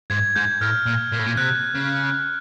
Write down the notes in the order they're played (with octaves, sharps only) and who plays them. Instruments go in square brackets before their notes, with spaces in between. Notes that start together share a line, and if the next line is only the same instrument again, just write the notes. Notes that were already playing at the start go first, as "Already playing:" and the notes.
[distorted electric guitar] G#2 [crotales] G#6
[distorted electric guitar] G#2 [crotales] G6
[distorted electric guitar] A2 [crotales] F6
[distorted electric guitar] A#2
A#2
A2
A#2
[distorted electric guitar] C3 [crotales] F#6
[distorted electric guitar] C#3